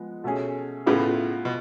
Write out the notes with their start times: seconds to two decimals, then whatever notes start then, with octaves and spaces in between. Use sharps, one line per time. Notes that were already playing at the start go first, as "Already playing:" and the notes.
Already playing: F3 G#3 B3
0.24 B2 A3 C#4 G#4
0.86 A2 C#3 B3 F4 B4
1.45 B2